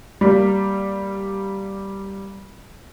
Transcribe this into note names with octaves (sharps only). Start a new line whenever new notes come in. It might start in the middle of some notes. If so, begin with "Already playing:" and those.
G3 A#3